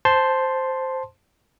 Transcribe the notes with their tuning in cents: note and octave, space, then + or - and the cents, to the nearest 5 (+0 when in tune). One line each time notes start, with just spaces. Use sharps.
C5 +0 A5 +0 C6 +0